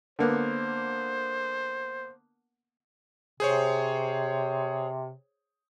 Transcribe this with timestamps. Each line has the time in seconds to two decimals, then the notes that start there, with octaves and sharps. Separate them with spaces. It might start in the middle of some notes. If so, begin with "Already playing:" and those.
0.19 D3 A#3 B3 C5
3.40 C3 G#4 C5 C#5